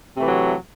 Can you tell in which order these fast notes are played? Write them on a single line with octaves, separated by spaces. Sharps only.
C3 A3 E3 F#3